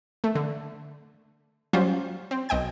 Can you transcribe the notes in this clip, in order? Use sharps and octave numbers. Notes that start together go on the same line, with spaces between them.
A3
D3
F#3 G3 C#4 F4 C5
C4
B1 D#5 G5 G#6